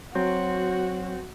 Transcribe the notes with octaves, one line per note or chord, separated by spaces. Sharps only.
F#3 C4 F#4